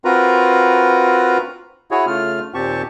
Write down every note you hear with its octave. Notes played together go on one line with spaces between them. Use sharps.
C4 F4 F#4 A#4 B4 A#5
E4 F#4 G#4 C#5
C#3 A3 F4 F6
D#2 A#2 C4 G4 A5 C#6